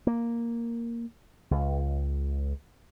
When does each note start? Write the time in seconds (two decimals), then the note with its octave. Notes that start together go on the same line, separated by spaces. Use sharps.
0.07 A#3
1.51 C#2